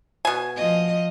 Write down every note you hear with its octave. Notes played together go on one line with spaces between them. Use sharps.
B2 G#5
F3 D#5